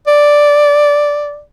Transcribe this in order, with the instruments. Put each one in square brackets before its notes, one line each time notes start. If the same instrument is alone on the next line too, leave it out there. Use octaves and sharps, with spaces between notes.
[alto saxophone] D5